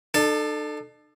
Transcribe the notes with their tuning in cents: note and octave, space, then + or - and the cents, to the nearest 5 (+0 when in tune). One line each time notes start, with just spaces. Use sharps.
D4 +45 A4 +0